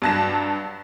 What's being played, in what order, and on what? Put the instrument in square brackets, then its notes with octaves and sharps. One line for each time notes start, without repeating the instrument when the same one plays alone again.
[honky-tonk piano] G2 F#3 A5 F#6 A#6 E7